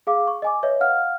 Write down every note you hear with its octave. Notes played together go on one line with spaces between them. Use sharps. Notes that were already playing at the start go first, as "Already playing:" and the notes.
G#4 F5 D6
C#6
D#5 G#5 D6
B4 C#5 D#5 E5
F5 F#5 F6